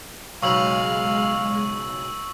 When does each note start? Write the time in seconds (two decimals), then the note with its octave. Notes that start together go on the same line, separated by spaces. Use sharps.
0.43 B1 C#3 G#3 F5 C#6 E6 F#7